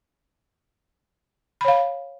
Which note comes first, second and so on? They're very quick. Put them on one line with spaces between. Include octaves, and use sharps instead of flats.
B5 C#5 F5